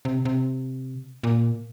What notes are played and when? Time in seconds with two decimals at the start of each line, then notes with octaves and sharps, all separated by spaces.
0.05 C3
0.25 C3
1.23 A#2